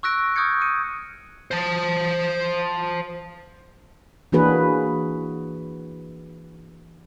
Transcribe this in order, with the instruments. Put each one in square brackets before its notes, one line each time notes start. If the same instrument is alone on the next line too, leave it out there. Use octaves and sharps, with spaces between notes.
[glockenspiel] C#6 E6 F#6 A#6 D7
C#6 D#6 F6 G6 G#6 C#7
C#7 D#7
[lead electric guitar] C5 A5
[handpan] E3 A#3 D4 F#4 G#4 B4